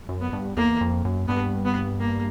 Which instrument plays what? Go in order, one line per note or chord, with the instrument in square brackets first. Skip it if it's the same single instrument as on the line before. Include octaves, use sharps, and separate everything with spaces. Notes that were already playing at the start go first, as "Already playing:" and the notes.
[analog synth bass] F#2
[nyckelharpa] B3
[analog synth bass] G2
[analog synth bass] E2 [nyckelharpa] A#3
[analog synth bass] F2
F#2
[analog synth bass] G2 [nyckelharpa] B3
[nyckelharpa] B3
A#3